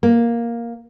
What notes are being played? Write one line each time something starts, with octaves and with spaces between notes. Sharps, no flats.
A#3